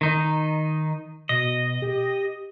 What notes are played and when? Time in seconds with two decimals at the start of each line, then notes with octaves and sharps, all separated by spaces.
0.01 D#3 D#4
1.29 B2 D#5
1.82 G4